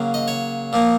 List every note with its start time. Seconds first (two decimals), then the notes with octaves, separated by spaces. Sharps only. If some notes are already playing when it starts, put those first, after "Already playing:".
Already playing: C#3 F#3 A#3 C#4
0.14 D#5
0.28 C#5
0.73 A#2 F3 A#3